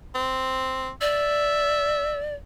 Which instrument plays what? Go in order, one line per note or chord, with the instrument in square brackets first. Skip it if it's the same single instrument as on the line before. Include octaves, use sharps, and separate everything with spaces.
[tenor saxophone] C4
[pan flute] D5 [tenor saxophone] E5